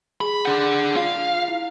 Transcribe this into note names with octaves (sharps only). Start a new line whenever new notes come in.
G#4 B5
D4 G#4 F#5 G6
F4 F5
E4 F5